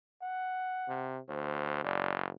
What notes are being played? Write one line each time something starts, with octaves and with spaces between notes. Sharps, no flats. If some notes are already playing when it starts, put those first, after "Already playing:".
F#5
C3
D2 C5
F#1 D5